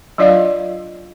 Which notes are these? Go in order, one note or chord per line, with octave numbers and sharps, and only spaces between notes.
F#3 D4 F4 D5 D#5 F5